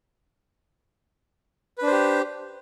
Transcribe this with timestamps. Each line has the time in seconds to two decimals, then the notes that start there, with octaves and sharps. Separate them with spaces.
1.78 B4
1.83 D4
1.87 C5
1.92 G4